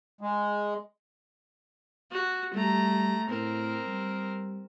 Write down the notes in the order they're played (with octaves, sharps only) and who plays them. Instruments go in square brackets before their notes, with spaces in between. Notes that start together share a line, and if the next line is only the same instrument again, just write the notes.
[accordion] G#3
[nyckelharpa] F#4
[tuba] G3 [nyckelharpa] A3 A#5
[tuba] A2 [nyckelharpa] C4 A#4
[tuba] G3